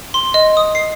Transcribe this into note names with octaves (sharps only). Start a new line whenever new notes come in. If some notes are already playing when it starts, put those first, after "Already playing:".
C6
D#5
D#6
C7